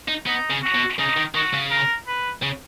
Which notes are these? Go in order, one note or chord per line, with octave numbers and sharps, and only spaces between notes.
D#4
B3 D#4
C#3
F#4
B2
C#3 D#4
D#3
D#3 F#4
C#3
A#4
B4
C#3